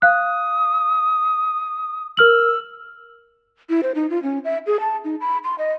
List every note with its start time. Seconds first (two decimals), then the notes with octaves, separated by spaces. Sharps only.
0.02 F5 D#6 F#6
2.17 A#4 E6 F6 F#7
3.70 E4
3.83 C5
3.95 D#4
4.10 F4
4.23 C#4
4.44 E5
4.67 G#4
4.80 A5
5.04 D#4
5.21 B5
5.44 C6
5.58 D#5